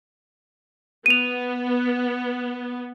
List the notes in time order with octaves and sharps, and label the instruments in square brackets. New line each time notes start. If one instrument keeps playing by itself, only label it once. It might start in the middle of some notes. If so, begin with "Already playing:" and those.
[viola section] B3 [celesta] D#7 F7